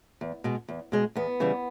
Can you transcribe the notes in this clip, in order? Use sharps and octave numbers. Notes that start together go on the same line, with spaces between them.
E2
B2 G#3
E2
B2 G#3
E2 B3
C#3 E3 G3